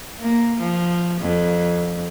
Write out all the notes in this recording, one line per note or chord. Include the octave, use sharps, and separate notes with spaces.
A#3
F3
F2